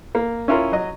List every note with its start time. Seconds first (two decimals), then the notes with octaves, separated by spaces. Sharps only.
0.15 A#3
0.48 C#4 E4 F4 A#4
0.72 F#3 D#5